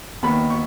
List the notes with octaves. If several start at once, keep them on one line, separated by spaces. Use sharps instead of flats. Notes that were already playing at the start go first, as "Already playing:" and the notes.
D#2 D#3 B3 B5
C#6